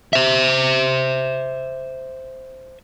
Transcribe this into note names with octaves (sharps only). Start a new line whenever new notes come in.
C5 E5